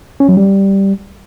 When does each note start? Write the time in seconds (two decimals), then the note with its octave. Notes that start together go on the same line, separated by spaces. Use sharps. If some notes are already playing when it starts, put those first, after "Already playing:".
0.20 C#4
0.29 F#3
0.37 G3